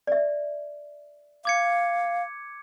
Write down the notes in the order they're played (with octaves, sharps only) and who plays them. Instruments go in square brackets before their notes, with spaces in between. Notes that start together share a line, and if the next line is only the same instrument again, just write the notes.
[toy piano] D5 E5
[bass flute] F5 [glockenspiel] D6 G#6 C#7